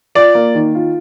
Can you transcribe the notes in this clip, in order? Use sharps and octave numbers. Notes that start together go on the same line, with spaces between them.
F4 D5
A#3
D#3
F4